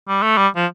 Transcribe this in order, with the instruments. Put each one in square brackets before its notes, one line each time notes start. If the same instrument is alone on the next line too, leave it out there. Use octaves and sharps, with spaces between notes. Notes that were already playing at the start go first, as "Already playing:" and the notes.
[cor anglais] G3
A3
G3
F3